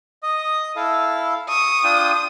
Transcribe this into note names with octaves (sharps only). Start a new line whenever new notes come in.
D#5 D#6
E4 A4 F5
C#6 D#6
D4 F4 G5